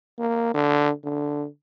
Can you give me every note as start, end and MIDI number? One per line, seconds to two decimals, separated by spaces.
0.19 0.53 58
0.54 0.91 50
1.04 1.46 50